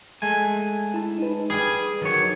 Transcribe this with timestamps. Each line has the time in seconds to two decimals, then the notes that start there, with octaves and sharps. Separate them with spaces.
0.22 G#3 A3 G#5
0.94 E4 A5
1.19 D#4 B4
1.50 G3 G#4 G#5
2.01 D#3 F#3 C#5